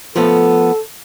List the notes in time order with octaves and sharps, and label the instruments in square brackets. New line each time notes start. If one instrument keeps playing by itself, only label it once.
[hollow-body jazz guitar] F3 A3 B3 [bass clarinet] A4